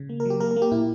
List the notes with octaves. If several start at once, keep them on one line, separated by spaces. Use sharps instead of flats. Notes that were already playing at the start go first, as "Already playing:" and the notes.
Already playing: C#3
A#3
A#4
F#3 G4
A#3 A#4
A#4
A#3
G4
A#2 E4